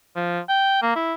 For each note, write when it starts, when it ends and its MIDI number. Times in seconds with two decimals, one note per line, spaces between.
0.16 0.40 53
0.49 0.78 79
0.82 0.96 58
0.96 1.14 64